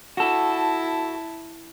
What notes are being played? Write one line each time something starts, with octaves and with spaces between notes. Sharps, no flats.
E4 F#4 A4 A5